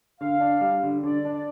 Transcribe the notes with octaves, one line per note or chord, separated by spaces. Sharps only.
D3 F5
D4
G3
D3
D3 D5
D4